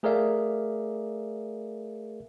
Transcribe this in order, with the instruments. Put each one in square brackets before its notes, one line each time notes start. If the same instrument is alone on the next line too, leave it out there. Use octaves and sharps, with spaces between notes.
[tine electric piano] A3 G#4 A#4 D5 E5 F5